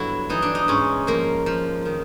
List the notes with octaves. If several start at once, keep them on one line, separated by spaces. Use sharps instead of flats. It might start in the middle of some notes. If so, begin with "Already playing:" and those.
Already playing: G2 D3 F#3 B3 E4
E3 D#4
D4
D#4
G#2 C#4
F3 A#3
F3
D#3